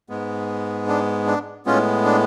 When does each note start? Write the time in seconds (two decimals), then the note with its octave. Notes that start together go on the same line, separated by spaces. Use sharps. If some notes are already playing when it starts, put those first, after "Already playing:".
0.09 G#2 G#3 B3
0.88 D4
1.27 D4
1.66 A2 G#3 B3 C#4 F4
2.05 D4